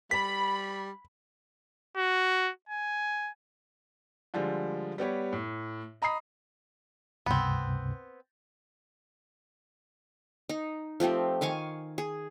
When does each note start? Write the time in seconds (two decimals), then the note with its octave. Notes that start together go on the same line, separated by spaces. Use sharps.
0.11 G3 B5 B6
1.97 F#4
2.69 G#5
4.34 D3 F3 G3 G#3
4.98 G3 B3 G4 C#5
5.33 A2
6.02 D#5 A#5 B5 D#6 C7
7.26 C#2 G2 C3 B3 C4
10.49 D#4
11.00 F3 A3 C4 G4
11.41 D#3 F5 G#5 C#6
11.98 G#4